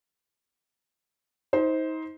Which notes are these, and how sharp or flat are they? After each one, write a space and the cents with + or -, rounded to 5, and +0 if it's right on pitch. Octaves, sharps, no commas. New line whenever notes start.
D#4 +35 C5 +0